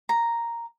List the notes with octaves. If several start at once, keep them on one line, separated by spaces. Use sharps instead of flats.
A#5